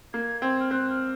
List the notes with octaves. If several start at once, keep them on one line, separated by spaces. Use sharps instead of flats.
A#3 G#6
C4 G#6
F6
C4 F#6
F6